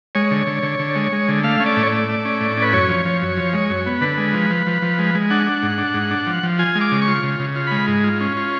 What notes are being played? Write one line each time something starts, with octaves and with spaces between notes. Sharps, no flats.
G#3 C#5
D3
D3
D3
D3
G#3
G#3
D3
A3 F5
C#4
D5
A2
C#5
D5
A3
A3
C#4
A2
C#4 B4
F#2 C#5
F3
F3
F#2
F3
G#3
F#2
B3
D3 B4
G#3
F3
F3
F3
F3
G#3
G#3
D4 F#5
D4
G#2
D4
G#2
D4
F3
F3
F4 G#5
G#3
D6
C#3
C#6
F4
C#3
C#3
F4
G#3 B5
G#2
F4
C#4
F4